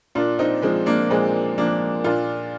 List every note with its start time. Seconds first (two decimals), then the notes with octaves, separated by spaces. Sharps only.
0.15 A#2 D4 F4
0.39 C4 D#4
0.62 F3 G#3 C4
0.86 A#3 D4
1.10 A#2 G#3 C4
1.58 F3 A#3 D4
2.04 A#2 D4 F4